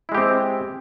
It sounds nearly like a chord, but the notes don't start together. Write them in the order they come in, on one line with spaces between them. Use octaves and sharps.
E4 G#3 G4 C4